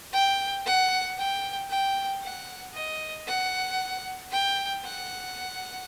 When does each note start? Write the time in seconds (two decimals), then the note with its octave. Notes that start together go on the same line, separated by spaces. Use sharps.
0.13 G5
0.66 F#5
1.18 G5
1.70 G5
2.23 F#5
2.74 D#5
3.28 F#5
4.31 G5
4.85 F#5